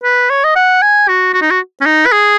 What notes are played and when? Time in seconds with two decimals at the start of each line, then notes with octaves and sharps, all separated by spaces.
0.03 B4
0.30 C#5
0.44 D#5
0.56 F#5
0.82 G#5
1.08 F#4
1.34 F#4
1.42 D#4
1.51 F#4
1.81 C#4
1.86 D#4
2.06 B4
2.12 G#4